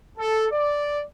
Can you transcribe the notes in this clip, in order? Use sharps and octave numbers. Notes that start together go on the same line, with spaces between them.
A4
D5